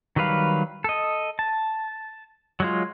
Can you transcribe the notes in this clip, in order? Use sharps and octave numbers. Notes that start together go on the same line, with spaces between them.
D#3 F#3 G3 B4 F5
A4 D#5
A5
F#3 G#3 F4